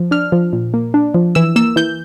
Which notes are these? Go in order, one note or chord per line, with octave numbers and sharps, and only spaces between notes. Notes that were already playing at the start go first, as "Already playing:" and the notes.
Already playing: F3
D4 F6
F3
A#2
A#3
D4
F3
E3 E6
A#3 E6
E3 G6